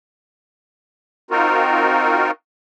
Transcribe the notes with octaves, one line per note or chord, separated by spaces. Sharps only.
C4 D#4 F4 F#4 A#4